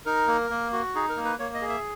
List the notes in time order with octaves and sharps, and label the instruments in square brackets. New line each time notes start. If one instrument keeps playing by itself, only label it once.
[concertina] D#4 A#4
A#3
A#3
F#4
D#4 G#4
A#4
A#3
B4
A#3 C#5
D#5
G#4
E5